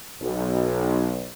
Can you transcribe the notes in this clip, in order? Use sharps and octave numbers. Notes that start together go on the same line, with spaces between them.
B1